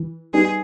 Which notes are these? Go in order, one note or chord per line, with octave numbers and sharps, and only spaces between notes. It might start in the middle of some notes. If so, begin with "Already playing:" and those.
Already playing: E3
G3 B3 D#4 G#4